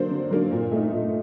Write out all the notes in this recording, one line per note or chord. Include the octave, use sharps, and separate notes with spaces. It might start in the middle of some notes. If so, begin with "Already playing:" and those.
Already playing: D3 F#3 A#3 D4 C5
D3
F#3 A#3 D4
A#2
A3 D#4
A#2